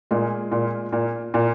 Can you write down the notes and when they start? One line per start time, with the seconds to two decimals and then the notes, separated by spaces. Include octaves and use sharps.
0.11 A#2 G#3
0.52 A#2
0.93 A#2
1.34 A#2